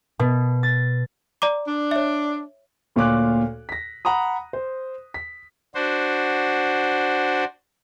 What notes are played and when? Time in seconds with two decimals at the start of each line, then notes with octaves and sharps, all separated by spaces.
0.19 B2
0.63 A6
1.42 D5 A#5 D6
1.68 D4
1.91 C#5 E5
2.96 D2 A#2 C#5 F5 D6 F#6
3.69 A#6 B6
4.05 F#5 A#5 B5 D#6
4.53 C5
5.14 B6
5.75 D4 F#4 C5